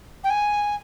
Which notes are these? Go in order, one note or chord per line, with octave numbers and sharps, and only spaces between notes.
G5
G#5